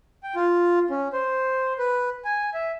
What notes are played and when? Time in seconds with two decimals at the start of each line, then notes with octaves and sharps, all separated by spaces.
0.23 G5
0.36 F4
0.90 C#4
1.13 C5
1.79 B4
2.25 G#5
2.54 E5